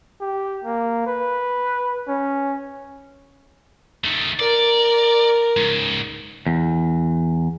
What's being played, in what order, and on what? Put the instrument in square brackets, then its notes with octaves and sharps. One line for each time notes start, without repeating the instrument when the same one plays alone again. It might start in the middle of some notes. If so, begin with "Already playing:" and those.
[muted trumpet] G4
A#3
B4
C#4
[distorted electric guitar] D#3 A3
[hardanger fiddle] A#4 [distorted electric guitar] D5
[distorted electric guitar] G#2 C#3
[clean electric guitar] E2